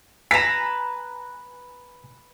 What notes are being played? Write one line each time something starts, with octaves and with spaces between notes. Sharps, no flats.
B4 G#5 A#5 B6 E7